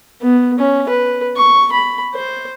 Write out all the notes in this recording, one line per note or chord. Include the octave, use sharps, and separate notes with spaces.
B3
C#4
B4
C#6
B5
C5